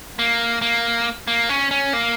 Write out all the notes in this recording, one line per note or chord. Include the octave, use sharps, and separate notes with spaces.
A#3
A#3
A#3
C#4
C#4
A#3